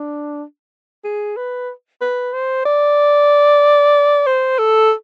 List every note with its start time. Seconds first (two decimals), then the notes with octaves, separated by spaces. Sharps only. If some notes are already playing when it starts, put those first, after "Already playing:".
Already playing: D4
1.04 G#4
1.37 B4
2.01 B4
2.33 C5
2.65 D5
4.26 C5
4.59 A4